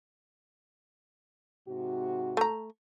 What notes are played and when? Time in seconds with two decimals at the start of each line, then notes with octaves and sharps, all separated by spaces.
1.67 G#2 C3 F#4
2.37 A3 A#5